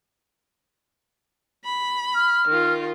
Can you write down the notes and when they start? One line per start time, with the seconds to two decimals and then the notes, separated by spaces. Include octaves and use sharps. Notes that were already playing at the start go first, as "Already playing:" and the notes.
1.65 B5
2.15 F6
2.48 D#3 F4